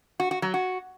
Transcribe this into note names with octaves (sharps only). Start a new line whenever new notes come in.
F#4
F#4
F#3
F#4